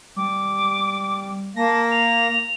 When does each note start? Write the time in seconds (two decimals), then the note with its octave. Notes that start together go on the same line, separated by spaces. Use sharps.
0.16 G3 D6
1.56 A#3 A5 A#6
1.91 F7